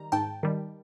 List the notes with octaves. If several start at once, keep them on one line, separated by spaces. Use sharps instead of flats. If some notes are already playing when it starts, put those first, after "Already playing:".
Already playing: D#3 G3 A#5
G#2 G5 A5
D#3 G3